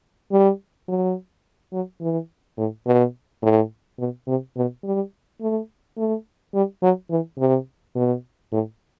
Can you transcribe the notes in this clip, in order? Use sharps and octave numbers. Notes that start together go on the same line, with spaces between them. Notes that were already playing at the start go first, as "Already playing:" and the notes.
G3
F#3
F#3
E3
A2
B2
A2
B2
C3
B2
G3
A3
A3
G3
F#3
E3
C3
B2
A2